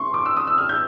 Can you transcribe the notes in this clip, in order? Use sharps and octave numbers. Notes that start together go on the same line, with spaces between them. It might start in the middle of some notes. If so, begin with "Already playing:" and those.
Already playing: C6 C#6
D6
E6
D#6
E6
F6
G6